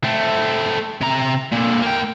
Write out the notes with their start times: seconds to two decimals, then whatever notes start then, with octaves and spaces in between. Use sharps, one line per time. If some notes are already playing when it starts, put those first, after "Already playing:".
0.04 A3 C4
1.01 C3 A#5
1.52 A#2 D3
1.82 A#3 G5